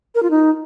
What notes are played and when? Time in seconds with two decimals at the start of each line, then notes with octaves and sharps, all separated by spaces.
0.15 A#4
0.23 F4
0.31 D#4